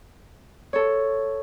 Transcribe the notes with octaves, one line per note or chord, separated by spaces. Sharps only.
A4 C#5